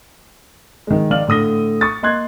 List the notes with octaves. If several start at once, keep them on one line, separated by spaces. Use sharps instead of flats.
D#3 G#3
D#3 D5 F5 F6 F#7
A2 D3 D#6 A#6 G7
C#6 D#6 A6
A#3 D#5 C6 F#6 G#6